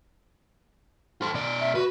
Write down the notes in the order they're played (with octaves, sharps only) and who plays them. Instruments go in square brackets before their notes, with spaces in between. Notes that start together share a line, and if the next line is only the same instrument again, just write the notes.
[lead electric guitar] A4 C5
B2 D5
[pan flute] E5
[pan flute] F#4 [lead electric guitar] B4